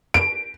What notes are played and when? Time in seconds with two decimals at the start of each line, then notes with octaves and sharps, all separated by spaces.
0.14 D7